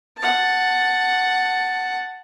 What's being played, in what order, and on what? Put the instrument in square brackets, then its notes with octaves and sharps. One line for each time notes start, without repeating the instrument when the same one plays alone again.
[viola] F#5 A5